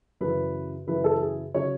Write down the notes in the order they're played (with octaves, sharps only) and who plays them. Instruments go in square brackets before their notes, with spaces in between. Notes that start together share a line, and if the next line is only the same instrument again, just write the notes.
[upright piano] F#2 C#3 E3 B4
F#2 C#3 E3 B4
A4
G#4
C#3 F#3 C#5